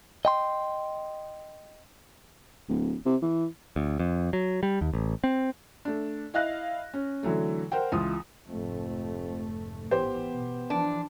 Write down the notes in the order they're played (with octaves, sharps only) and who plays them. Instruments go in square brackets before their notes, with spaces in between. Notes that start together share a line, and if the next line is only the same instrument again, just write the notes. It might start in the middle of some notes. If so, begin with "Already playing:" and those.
[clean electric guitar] D#5 G5 C6
[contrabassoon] D1
C3
E3
[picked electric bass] D2
F2
F#3
G3
D#2
A1
C4
[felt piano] A3 D4
E4 D#5 F5 F#6 A#6
C#4
D3 E3 F#3 A3
A#4 C5 F#5 G5
C#2 E3 F4 D#6
[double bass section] F1 G#2 A3 [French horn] F2
[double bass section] A1 E3 [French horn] B3 [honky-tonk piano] G4 C5
[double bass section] B2
[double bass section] E3 F3 [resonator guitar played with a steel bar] D4